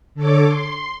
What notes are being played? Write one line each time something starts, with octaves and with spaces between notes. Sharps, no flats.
D3 A4 C#5 D6
C6